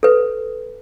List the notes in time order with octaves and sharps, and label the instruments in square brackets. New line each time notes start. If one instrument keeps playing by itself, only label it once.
[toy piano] A4 B4